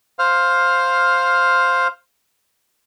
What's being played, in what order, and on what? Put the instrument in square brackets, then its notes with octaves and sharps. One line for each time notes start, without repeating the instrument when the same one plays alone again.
[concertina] C5 F5 F6